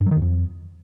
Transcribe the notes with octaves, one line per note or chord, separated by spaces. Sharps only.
G2
F#3
D#3
E2
F2